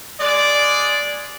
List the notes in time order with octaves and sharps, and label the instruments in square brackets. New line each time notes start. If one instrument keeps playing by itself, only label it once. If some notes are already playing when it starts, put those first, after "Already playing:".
[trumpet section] G#3 D5